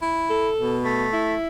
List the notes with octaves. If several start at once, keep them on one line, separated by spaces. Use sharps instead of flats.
E4
A4
B2
A3
E4